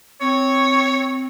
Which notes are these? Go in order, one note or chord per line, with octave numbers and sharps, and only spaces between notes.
C4 C#5